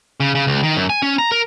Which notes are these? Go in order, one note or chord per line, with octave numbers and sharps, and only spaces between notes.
C#3
C#3
C#2
D#3
F#2
G#5
C#4
A#5
A#4